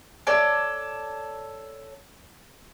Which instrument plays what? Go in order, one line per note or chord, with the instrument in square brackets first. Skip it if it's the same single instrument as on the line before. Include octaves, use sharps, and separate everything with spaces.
[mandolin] A4 C#5 D5